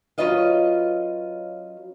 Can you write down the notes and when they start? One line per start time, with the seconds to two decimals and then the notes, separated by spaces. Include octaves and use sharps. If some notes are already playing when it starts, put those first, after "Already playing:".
0.18 F#3 C#4 F4 B4 D#5 F5